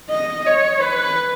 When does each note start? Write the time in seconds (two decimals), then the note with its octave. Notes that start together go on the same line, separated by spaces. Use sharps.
0.10 D#5
0.46 C#5
0.81 B4